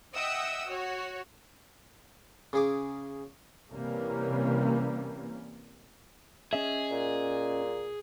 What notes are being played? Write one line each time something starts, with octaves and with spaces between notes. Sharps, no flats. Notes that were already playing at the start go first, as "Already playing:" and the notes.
D#5 E5 F#5 G5 D#6 E6
F#4 C#5
C#3 G#4 D6
C3 E3 G3 A#3 C#4
C#4 G#4 D#5 E5
A#2